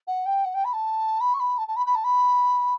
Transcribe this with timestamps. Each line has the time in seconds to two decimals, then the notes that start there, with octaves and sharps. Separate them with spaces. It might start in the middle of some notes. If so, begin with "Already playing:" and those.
0.07 F#5
0.26 G5
0.45 F#5
0.54 G5
0.65 B5
0.73 A5
1.21 B5
1.34 C#6
1.40 B5
1.58 A5
1.68 A5
1.76 B5
1.86 B5
1.95 A5
2.04 B5